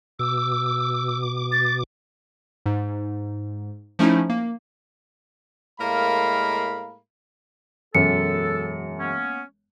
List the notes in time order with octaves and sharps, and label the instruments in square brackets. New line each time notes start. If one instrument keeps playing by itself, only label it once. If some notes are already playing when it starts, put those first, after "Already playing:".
[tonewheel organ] B2 D6 [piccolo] E6
[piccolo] A6
[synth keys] G#2
F3 A3 C#4 D#4 E4
A#3
[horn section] A2 G#3 A#3 A#4 F5 B5
[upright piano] E1 F#2 [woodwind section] A4 [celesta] C#7
[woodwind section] A#3 B3 C#4